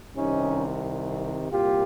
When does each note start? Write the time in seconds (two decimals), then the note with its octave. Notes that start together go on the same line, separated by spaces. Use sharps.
0.16 C2 C3 D#3 C#4 D#4
1.50 C2 A#2 F4 G4